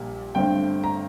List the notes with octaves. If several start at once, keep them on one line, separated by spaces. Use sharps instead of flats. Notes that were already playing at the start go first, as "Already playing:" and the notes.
Already playing: A#1 A#2 G3
G1 G2 D3 A3 C4 G5
A#5